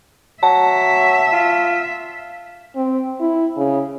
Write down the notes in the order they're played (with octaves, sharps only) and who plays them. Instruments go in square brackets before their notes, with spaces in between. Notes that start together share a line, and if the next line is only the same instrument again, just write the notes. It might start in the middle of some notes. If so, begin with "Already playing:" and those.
[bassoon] F#3 [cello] E5 [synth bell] A5
[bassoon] F4
[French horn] C4
E4
C#3